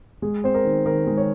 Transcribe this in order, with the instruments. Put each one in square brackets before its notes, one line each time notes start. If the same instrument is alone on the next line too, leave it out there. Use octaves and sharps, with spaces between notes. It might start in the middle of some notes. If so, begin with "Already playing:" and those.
[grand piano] G#3 G#4
C4 C5
A#4
D#3
D#3 A#4
G#3
C#5